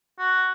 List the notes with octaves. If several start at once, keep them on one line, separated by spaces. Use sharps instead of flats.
F#4